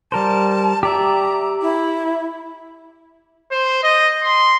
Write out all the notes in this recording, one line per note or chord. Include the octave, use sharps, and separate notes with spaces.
G3 A#4 C5 A5
G4 D5 E5 A#5
E4
C5
D#5
C6